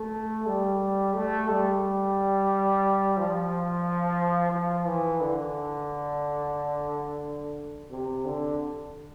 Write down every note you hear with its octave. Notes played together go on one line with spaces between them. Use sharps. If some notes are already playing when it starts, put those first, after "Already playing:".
Already playing: A3
G3
A3
G3
F3
F3
E3
D3
C3
D3